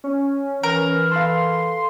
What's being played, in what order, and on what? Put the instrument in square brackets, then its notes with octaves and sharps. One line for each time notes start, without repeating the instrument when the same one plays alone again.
[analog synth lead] C#4
[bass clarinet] E3 [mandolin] A#4
[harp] A4 B4 F5 [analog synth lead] C6